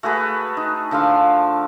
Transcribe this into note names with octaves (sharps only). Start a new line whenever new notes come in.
A3 F#4 G#4 B4
D#4
D3 F3 E5 F5